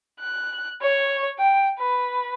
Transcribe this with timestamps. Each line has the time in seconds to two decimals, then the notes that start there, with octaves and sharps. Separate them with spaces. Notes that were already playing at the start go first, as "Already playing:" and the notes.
0.20 F#6
0.82 C#5
1.39 G5
1.79 B4